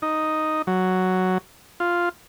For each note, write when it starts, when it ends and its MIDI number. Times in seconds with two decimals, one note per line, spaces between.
0.02 0.62 63
0.67 1.38 54
1.80 2.09 65